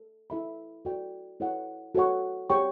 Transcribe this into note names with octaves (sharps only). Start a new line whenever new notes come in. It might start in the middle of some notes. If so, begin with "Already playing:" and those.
Already playing: A4
E4 A4 E5 B5
F#4 A4 D5 G5
E4 A4 C#5 F#5
F#4 A4 C#5 F#5 C#6
G4 C#5 G5 C#6